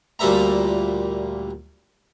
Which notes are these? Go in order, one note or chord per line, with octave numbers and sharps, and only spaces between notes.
D2 A#2 G3 A4 E5 A#5